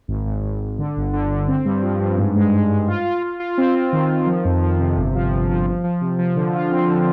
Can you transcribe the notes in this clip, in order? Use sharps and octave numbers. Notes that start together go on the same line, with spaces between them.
G#1
G#1
G#1
G#1
D3
G1
D3
D3
C4
G2
F3
G2
G#2
G#3
G#3
G#2
F4
F4
F4
F4
C4
C4
D#3
D#3
F3
F2
F3
C3
G1
F3
G1
F3
F3
F3
C3
F3
D3
F4
C4
D3